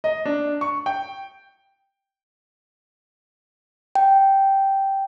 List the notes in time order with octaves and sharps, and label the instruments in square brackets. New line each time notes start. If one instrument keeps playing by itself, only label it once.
[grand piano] D#5
D4
C#6
G5
[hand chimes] G5